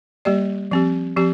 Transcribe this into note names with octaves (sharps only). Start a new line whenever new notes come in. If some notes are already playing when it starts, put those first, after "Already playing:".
G3 A#3 G4 D5
F3 C4 G4
F3 C4 G4